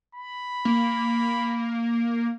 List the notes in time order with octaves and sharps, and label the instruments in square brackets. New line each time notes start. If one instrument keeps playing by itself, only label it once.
[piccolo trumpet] B5
[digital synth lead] A#3